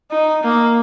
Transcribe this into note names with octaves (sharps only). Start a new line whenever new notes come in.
D#4
A#3